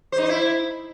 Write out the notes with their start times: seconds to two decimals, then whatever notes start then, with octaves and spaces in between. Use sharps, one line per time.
0.12 C5
0.18 D#4
0.23 C5
0.29 E4